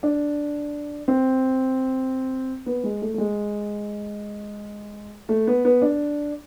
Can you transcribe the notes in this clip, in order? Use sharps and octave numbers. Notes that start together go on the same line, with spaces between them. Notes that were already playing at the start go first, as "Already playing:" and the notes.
D4
C4
B3
G#3
A3
A3
G#3
A3
B3
B3
D4